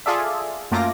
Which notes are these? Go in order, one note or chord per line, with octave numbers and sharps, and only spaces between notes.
F4 G#4 A4 D5 E5
F#2 A3 A#3 F4 D6 A#6